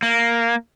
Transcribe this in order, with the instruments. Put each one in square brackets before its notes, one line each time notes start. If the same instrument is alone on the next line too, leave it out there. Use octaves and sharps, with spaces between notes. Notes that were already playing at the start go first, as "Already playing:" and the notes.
[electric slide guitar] A#3